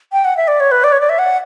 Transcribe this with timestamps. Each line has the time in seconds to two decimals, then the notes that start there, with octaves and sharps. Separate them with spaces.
0.13 G5
0.25 F#5
0.37 E5
0.48 D5
0.60 C#5
0.72 B4
0.84 D5
0.92 C#5
1.01 D5
1.09 E5
1.19 F#5